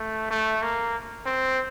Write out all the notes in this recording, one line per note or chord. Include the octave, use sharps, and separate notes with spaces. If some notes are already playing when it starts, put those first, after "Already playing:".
Already playing: A3
A3
A#3
C4